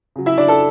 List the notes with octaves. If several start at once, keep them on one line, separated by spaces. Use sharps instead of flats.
C#3 F#3
E4 E5
D4 D5
A4 A5